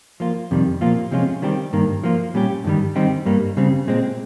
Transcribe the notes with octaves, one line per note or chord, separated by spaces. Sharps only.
F3 A#3 F4
F2 C3 D#3 G3
A#2 F3 A#3 F4
C3 F3 G#3 C#4 F4
D#3 G3 C4 G4
G2 D#3 A#3
F3 A#3 F4
A#2 G3 C#4 G4
G2 D#3 G3
D#3 G3 C4 D#4 G4
G2 G3 A#3
C#3 G3 C4
A#2 G#3 C4